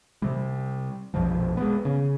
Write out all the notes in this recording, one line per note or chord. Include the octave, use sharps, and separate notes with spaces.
C3 G3
A#1 F2 B2 F3
G#3 B3
C#3